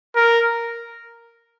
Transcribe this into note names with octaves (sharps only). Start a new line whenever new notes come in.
A#4